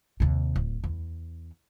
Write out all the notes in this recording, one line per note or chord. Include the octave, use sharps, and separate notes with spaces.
D#2 C3
D1
E2